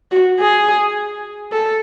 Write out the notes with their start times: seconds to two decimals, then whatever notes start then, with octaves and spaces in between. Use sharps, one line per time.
0.11 F#4
0.40 G#4
1.52 A4